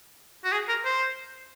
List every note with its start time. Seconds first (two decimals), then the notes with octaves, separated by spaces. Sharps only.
0.44 F#4
0.52 G#4
0.68 A#4
0.85 C5